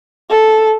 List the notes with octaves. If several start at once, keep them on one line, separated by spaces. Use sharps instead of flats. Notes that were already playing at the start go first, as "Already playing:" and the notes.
A4